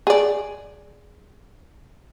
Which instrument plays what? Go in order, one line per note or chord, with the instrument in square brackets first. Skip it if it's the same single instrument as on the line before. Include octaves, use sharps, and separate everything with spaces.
[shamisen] G#4 D5